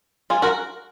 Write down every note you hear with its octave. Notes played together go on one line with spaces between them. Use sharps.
F4 G#4
F#4 A#4